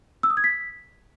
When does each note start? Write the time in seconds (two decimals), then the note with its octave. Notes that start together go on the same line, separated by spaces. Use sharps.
0.23 E6
0.30 D#6
0.37 G#6
0.44 B6